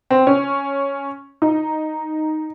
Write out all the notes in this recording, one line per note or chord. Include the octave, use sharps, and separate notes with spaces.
C4
C#4
D#4